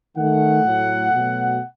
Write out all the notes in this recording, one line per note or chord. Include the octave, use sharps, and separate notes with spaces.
D#3 A3 F#5
A2 F#3 A3
B2 F#3 A3